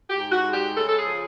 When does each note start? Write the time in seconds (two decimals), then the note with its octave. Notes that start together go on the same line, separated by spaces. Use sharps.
0.09 G4
0.16 G#2
0.31 F#4
0.47 G#3
0.54 G4
0.76 C#3 A4
0.89 A4
0.99 G#4
1.06 F3